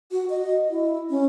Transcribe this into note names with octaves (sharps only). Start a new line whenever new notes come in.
F#4
D#5
E4
C#4